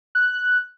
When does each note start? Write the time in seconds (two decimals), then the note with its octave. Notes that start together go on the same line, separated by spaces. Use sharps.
0.15 F#6